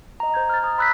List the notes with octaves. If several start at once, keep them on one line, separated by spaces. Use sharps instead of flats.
D#5 A#5
C5 G6 G#6
F6 A6
A#5 D#6
B5 E6 F#6 G6 B6